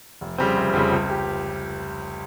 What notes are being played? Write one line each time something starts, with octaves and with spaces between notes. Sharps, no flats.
F1
F2 C#3 G3 C4
F1
F2 C#3 G3 C4
C#2
G4